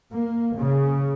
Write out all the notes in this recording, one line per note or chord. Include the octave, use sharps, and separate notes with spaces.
A#3
C#3